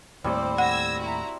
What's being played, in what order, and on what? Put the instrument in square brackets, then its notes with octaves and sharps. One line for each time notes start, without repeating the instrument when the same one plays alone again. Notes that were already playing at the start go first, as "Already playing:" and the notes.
[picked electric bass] D#2 A2 [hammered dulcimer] G3 C4 G4 [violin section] C5 D5
[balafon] F#5 [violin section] E6 G#6 A#6
[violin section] E4 F#4 A#5